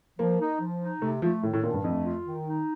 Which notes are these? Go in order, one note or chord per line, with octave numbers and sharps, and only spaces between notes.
F3 A#3
D#4
F3
D#4
C3 A3
F3 A3
A2 D#3
A2
A#2 D4
G2
F2 A3
F4
D#3
D#4